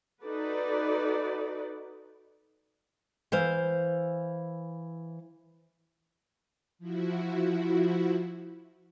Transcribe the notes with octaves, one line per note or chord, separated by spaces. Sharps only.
D#4 F#4 A4 B4 D5
E3 C5 F5
F3 E4 F#4